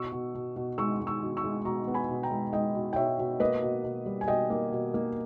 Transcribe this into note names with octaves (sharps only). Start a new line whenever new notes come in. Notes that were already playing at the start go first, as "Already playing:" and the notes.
Already playing: B2 C#6 E6
B2
B2
B2
G#3 C#6 E6
G#3
C#6 E6
B2
C#6 E6
G#3
B2 A#5 C#6
B3
G#5 B5
B2
G5 A#5
G#3
G#3 D#5 G5
B2
G5
B2 C#5 E5
B2
A#3 B4 D#5
B2
B2
G3
G#5
B2 D#5 G5
A#3
B2
A#3